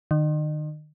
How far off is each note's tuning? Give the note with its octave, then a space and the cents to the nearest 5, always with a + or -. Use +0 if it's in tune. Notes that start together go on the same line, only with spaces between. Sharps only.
D#3 -35